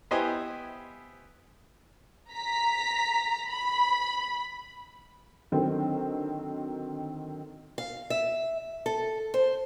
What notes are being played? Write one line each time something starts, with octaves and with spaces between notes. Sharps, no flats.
B3 E4 G4 C5 D#5 G#5
A#5 B6
B5
D3 D#3 F#3 C4
F5
E5
A4
C5